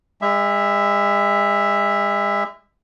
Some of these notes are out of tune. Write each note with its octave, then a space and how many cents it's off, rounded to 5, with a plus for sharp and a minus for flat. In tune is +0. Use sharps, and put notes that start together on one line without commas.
G#3 -40 E5 +0